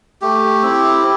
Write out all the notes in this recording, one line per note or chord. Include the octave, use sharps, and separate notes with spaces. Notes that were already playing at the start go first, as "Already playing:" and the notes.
A3 G4
C4 E4